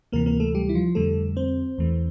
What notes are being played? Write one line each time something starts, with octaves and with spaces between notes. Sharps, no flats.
D2 C3 E3 A#3 A#4
A#3 A#4
A3 A4
G3 G4
E4
F3 F4
F2 D3 G3 A3 A4
C4 C5
E2 E3 A3